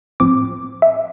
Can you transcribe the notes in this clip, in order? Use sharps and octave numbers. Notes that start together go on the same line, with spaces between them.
A2 F3 C4 D6
E5